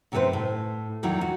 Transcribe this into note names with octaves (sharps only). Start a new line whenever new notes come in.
F#2 C3 D#3 A4 B4 C5
A2
E2 A#2 D#3 F#3 E4
F#4